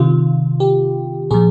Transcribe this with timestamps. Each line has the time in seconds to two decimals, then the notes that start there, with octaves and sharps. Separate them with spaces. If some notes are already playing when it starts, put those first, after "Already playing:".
Already playing: C3 D#3 F4
0.60 G4
1.31 A#2 F3 G#4